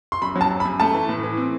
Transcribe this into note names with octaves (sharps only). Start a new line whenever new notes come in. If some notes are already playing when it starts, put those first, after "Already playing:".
C6
F#2 B5
F#3
A5
F#2
B5
F#2
A3 A5
E3
A2
E3
C4